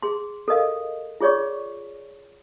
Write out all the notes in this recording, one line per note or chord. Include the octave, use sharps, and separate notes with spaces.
G#4 C6
A4 A#4 D#5 F5
F4 G#4 C#5 D5 C#6